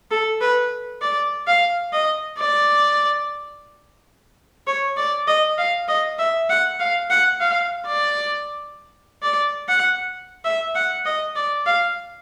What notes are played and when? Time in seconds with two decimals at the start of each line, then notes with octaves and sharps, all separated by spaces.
0.11 A4
0.41 B4
1.02 D5
1.47 F5
1.93 D#5
2.38 D5
4.67 C#5
4.97 D5
5.27 D#5
5.58 F5
5.88 D#5
6.19 E5
6.49 F#5
6.80 F5
7.10 F#5
7.40 F5
7.86 D5
9.22 D5
9.68 F#5
10.45 E5
10.75 F#5
11.05 D#5
11.36 D5
11.66 F5